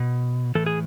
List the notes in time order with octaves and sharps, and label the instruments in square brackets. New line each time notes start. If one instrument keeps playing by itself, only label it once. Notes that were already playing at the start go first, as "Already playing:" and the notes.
Already playing: [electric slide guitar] B2
A2 E3 A4
G#4